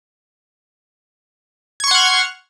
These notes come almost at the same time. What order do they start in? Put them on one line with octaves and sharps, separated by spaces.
G#6 C#6 C6 F#5 F6